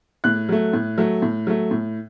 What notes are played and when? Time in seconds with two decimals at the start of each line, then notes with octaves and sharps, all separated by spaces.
0.24 A2 F#6
0.49 F#3 A3
0.73 A2
0.98 F#3 A3
1.22 A2
1.47 F#3 A3
1.71 A2